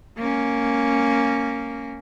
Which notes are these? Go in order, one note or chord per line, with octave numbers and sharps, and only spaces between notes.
A#3 C#4